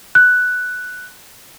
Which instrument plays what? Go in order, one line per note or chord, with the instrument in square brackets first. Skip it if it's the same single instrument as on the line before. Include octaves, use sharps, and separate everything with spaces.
[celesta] F#6